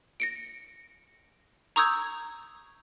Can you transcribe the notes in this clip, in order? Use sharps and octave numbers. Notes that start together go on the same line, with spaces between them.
A#6 C#7 D7
A#5 C#6 D#6 E6 G6 G#6